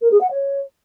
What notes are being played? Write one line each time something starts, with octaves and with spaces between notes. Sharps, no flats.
A#4
G#4
F#5
C#5